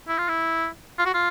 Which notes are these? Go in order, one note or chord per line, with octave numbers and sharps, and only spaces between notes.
E4
F4
E4
F4
F#4
F4